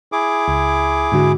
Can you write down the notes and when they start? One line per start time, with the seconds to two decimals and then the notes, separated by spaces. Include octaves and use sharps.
0.12 E4 G#4 D6
0.48 C#2
1.12 G#2 D3 F#4